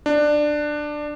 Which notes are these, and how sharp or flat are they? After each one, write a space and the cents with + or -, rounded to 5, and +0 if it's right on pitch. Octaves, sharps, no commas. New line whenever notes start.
D4 +15